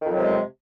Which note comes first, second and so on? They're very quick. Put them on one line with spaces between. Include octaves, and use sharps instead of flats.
D#3 F2 F#3 C3 G#3